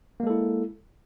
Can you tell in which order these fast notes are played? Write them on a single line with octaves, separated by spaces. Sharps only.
A#3 G#3 A4 E4